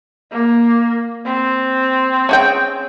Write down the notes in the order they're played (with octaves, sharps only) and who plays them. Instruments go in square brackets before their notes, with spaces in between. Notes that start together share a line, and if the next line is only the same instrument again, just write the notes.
[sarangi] A#3
C4
[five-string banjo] C#4 G#4 G5